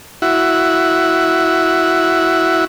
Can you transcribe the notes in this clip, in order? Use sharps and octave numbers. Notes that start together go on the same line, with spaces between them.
E4 F#4